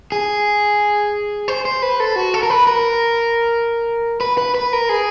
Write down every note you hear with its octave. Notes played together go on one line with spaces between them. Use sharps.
G#4
C5
C5
B4
A4
F#4
A4
A#4
B4
A#4
B4
B4
B4
A#4
G#4